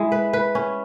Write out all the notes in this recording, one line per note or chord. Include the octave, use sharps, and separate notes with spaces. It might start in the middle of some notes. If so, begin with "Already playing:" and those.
Already playing: G#3 E4 E5
B4
B4
C#4